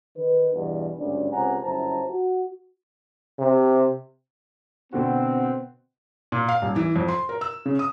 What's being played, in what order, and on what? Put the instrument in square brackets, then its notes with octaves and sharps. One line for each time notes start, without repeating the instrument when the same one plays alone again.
[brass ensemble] D#3 B4
E2 G2 B2
G#1 D2 G2 C#4 D4
C#2 C3 C#4 F#5 G#5 A#5
G1 F#2 E4 C5 A5 A#5
F#4
[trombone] C3
[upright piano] B2 D3 F#4 [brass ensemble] C4
[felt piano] A#2
F5
D#1
E3
F2
C6
A#4
E6
C#3
D#6